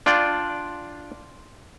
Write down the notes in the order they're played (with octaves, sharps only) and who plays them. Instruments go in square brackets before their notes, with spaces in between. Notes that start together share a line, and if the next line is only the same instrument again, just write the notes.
[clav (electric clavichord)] D4 F4 D5 G5